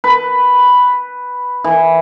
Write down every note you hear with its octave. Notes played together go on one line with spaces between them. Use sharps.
B4
E3